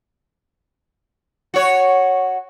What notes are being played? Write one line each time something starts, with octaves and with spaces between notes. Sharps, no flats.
F#4 C#5